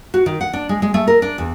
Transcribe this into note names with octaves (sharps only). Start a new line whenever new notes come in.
F#4
D#3
F#5
D4
G#3
G#3
A3
A#4
D4
E2